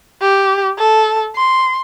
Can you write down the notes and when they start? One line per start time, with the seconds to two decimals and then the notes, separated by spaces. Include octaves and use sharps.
0.22 G4
0.79 A4
1.35 C6